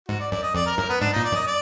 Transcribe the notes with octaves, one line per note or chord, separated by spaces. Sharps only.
G#2 F#4
D5
F#2 D5
D#5
F2 D5
A#4
F#2 A#4
B3
G#2 D4
A#2 D#4
D5
F#2 D#5
D5